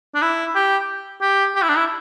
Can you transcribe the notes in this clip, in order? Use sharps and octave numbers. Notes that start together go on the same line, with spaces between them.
D4
E4
G4
G4
G4
E4
D4
E4